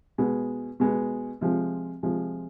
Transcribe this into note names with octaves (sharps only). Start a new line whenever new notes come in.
B2 G#3 B3
B2 G#3 B3
C3 F3 G#3
C3 F3 G#3